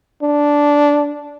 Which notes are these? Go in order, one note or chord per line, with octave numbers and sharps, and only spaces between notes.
D4